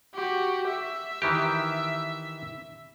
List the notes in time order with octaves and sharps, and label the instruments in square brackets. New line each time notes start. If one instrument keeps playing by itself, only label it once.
[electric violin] F#4 G4
E5
[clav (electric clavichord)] D#3 E3 G4